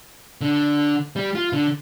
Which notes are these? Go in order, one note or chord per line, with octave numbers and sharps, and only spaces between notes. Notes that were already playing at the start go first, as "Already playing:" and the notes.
D3
G3
F4
D3